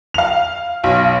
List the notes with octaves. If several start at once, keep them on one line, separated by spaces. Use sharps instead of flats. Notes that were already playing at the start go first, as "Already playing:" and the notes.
F5 F7
B1 F5